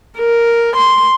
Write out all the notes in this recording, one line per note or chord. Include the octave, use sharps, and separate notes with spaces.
A#4
C6